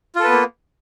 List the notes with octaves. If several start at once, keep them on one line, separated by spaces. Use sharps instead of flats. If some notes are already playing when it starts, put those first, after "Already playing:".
A#3 B3 F4 A4 B4